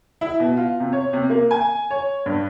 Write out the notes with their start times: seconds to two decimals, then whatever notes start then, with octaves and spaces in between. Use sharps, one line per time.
0.21 E4
0.40 B2
0.57 F4
0.80 C3
0.93 C#5
1.13 C3
1.30 A#3
1.51 G#5
1.91 C#5
2.26 G2